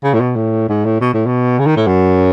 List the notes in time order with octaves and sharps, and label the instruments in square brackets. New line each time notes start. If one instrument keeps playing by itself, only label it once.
[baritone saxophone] C#3
A2
B2
A2
G#2
A2
B2
A2
B2
C#3
D#3
A2
F#2